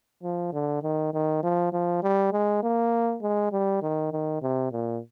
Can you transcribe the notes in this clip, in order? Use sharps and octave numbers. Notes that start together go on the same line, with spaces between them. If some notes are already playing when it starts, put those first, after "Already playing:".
F3
D3
D#3
D#3
F3
F3
G3
G#3
A#3
G#3
G3
D#3
D#3
C3
A#2